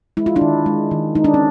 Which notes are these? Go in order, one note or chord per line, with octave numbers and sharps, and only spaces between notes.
G#3 E4
F4
D4 E4
D#3
G#3
D#3
G#3 D#4
D4
C#4